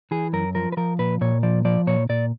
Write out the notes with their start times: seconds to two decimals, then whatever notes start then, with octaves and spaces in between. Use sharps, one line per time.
0.11 E3 G#4
0.33 F#2 A#4
0.55 F3 A#4
0.72 B4
0.77 F3 A#4
0.99 A#2 B4
1.21 A#2 C#5
1.43 F3 D5
1.65 F3 D5
1.87 A#2 C#5
2.09 A#2 D5